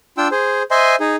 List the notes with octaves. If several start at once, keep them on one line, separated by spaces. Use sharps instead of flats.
D4 F4 G5 E6
G#4 C5
C5 D#5 E5 G#5 C6
D#4 G#4